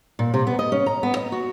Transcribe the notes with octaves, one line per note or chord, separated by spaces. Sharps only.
A#2
C3
B3
D#5
C#4
A#5
B3
D#5
F#4